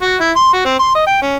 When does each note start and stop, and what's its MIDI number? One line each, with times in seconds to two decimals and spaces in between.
0.02 0.16 66
0.20 0.30 64
0.36 0.49 84
0.53 0.63 66
0.65 0.78 60
0.79 0.94 84
0.95 1.02 75
1.07 1.18 79
1.22 1.37 61